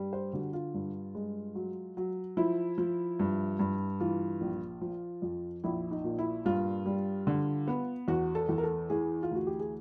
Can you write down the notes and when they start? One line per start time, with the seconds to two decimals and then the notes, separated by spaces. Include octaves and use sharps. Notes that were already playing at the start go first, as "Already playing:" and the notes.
Already playing: G2 G3
0.13 C5
0.33 D3 F#4
0.53 F4
0.74 G2
1.15 G#3
1.55 F#3
1.97 F#3
2.37 F3 E4
2.78 F3
3.19 G2
3.59 G2
4.00 E3 F4
4.41 A#1
4.81 F3
5.22 F2
5.64 A#1 E4
5.91 D#4
6.04 A#2
6.19 E4
6.45 G2 F4
6.86 G3
7.27 D3
7.68 B3
8.08 E2 F#4
8.35 A4
8.49 E2
8.58 A#4
8.63 A4
8.90 E3 G#4
9.23 F4
9.31 D2 F#4
9.47 G4
9.59 G#4